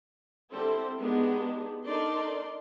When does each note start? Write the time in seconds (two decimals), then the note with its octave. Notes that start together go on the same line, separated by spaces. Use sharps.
0.50 D3 G3 C4 E4 A4 C5
0.99 G#3 B3 D4 D#4 G4 G#4
1.86 D4 D#4 A4 A#4 D5 C6